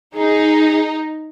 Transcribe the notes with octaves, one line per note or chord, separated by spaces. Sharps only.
D#4 G#4